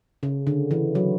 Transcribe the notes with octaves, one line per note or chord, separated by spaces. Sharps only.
C#3
D3
E3
F#3